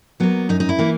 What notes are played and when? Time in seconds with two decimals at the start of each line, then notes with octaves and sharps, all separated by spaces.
0.20 F#3 A#3 B3
0.49 F#2 D#4
0.60 D#4
0.69 E4
0.79 E3 A#3